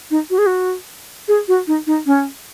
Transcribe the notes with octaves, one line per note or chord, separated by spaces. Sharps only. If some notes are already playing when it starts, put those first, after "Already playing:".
D#4
F#4
G#4
F#4
G#4
F#4
D#4
D#4
C#4